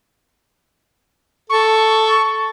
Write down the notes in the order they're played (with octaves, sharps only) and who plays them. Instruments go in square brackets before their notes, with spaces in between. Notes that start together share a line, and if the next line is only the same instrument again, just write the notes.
[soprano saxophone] A4 [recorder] C#6